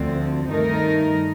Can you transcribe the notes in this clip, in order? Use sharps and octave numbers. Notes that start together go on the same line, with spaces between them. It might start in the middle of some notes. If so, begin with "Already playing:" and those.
Already playing: D2 D3 F3 C4
G2 D#3 A3 D#4 A#4